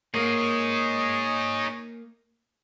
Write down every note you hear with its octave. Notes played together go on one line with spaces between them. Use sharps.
A#3 D#4 G#4 C#5 D#5 G#5